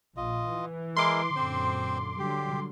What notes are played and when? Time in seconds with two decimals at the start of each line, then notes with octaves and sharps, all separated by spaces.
0.17 A#1 F4 D#5
0.51 E3
0.96 G#3 E4 A#4 C6 D6
1.36 F#2 A#2 D3 C4 C5
2.19 D3 F#3 G3 G4